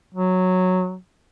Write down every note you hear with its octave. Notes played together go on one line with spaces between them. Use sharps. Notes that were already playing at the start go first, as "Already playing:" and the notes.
F#3